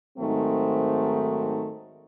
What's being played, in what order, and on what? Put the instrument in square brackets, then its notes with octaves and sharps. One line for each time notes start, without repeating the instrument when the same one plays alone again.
[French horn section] G#2 D#3 F#3 A3 C4